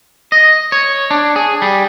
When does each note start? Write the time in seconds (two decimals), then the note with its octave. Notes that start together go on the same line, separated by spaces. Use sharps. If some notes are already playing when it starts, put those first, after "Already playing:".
0.32 D#5
0.72 C#5
1.11 D4
1.36 G#4
1.62 G3